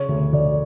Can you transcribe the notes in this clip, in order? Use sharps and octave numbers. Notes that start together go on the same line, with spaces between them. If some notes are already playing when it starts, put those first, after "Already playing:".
Already playing: C#3 C#5
D2
D2 D5